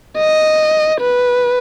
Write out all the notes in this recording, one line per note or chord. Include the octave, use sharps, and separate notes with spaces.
D#5
B4